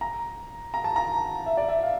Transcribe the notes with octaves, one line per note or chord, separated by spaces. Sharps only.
A#5
A#5
A5
A#5
E5
D5
E5
F5